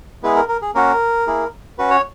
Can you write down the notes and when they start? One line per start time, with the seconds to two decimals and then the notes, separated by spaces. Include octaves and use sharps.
0.23 G#3 B3 E4 G#4 B4
0.36 A#4
0.48 A#4
0.62 G#4
0.74 A#3 C#4 F#4 A#4
1.27 A#3 E4 G#4
1.78 C#4 F#4 B4
1.90 C#5